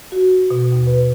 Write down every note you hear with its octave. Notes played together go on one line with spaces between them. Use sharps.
F#4
F#4
B2
D#2
B4